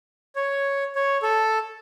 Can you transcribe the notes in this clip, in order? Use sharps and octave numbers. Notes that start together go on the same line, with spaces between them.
C#5
C#5
A4